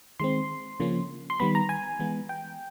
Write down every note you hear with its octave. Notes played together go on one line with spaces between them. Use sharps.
D#3 G#3 C4 C6
C#3 F3 A#3 C#4
C6
D#3 G3 B3 B5
A#5
G#5
E3 G#3 B3
G5